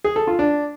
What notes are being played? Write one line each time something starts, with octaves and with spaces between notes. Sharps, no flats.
G#4
A4
F4
D4